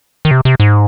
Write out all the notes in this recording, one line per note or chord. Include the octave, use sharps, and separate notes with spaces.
D#3
C3
C3
G#2